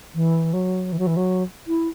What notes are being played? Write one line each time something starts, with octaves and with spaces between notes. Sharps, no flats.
E3
F#3
E3
F#3
E3
F#3
E4